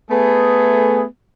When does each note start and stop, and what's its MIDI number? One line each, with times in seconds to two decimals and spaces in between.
0.11 1.04 57
0.11 1.04 59
0.11 1.04 68